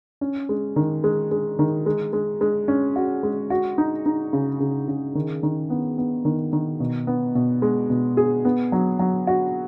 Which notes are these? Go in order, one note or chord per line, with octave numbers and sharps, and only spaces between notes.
C#4
G#3
D#3
G#3
G#3
D#3
G#3
G#3
G#3
C#4
F#4
G#3
F#4
D#4
D#4
C#3
C#3
C#3
D#3
D#3
B3
B3
D#3
D#3
B2
B3
B2
G#3
B2
G#4
B3
F#3
F#3
F#4